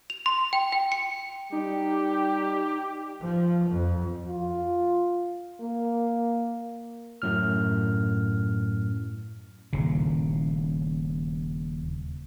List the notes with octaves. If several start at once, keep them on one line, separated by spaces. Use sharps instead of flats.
F7
C6
G5
G5
C#7
G3 D#4 G4
F3
F2
F4
A#3
F#2 A2 F6
D#1 C#3